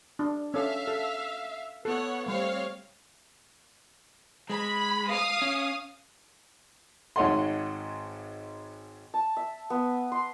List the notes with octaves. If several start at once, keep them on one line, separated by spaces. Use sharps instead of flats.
D4
C#4 A4 E5 F5
A4
B3 A4 C#5 F#5
G3 A3 C4 C#5 F5
G#3 B5
F5 D#6
C#4
G#1 G#2 C#5 D#5 F#5 C6
A5
E5
B3
C6